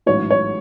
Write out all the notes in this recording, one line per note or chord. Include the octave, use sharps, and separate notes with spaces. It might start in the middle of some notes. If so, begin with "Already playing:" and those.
A1 G#2 F#3 C#5
C#5